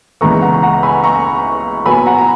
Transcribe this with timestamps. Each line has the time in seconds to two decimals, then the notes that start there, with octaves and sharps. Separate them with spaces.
0.21 C#2 C#3 E3 B3 A#5 C#6
0.42 F#5 A#5
0.62 F#5 A#5
0.83 G#5 B5
1.04 A#5 C#6
1.85 A#2 F#3 B3 G#5 B5
2.06 F#5 A#5
2.18 A#5